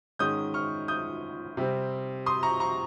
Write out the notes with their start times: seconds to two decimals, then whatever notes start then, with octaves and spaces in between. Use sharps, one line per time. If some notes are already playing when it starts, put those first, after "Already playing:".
0.19 G#2 D#3 G#3 C#4 D#6 G6
0.54 C#6 F6
0.88 D#6 G6
1.57 C3 G3 C4
2.26 C6 D#6
2.43 A#5 C#6
2.60 A#5 C#6